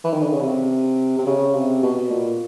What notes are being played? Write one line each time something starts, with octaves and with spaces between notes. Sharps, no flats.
E3
D#3
D3
C#3
C3
C3
C#3
C3
B2
A#2